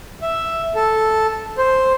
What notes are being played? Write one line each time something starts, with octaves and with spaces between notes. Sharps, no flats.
E5
A4
C5